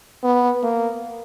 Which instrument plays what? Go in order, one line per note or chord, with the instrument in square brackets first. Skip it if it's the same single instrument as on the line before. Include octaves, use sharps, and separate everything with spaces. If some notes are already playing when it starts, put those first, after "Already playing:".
[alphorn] B3
A#3